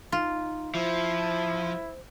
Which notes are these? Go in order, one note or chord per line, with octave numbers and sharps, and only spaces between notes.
D#4 F4
F3 E4 C5